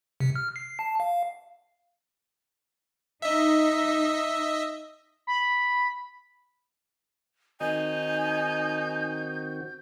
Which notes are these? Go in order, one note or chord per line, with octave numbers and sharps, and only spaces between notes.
C3
F6
C7
A5
F5
D#4 D#5 E5
B5
D#3 C4 D#4 F#4 G#5 G6